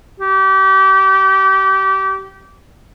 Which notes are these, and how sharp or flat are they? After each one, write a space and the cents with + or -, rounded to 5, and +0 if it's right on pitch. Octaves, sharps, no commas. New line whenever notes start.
G4 -30